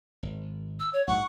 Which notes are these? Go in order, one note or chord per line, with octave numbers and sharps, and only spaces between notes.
G#1
E6
C#5
A#1 G#2 F#3 F#5 C#6